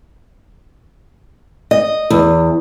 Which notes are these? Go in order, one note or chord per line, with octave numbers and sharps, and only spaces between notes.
D#5
E2